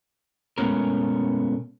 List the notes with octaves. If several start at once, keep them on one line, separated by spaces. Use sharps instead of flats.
B2 G#3 A3 B3 C#4 A#4